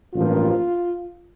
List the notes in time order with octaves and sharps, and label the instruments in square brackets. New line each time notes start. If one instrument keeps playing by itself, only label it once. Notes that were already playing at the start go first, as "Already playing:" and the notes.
[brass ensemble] A1 G2 F3 A#3 F4